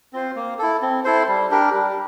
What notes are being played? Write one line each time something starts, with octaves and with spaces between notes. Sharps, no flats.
C4 F4 C5
A#3
E4 A4
C4
E4 A4 C5
G3
D4 G4 A#4
G3